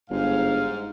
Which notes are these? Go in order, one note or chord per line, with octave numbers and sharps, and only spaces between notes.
G1 G#2 F5